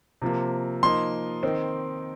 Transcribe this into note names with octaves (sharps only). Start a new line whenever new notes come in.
C3 F3 A#3
F3 A#3 D#4 C6
D#3 C4 D#4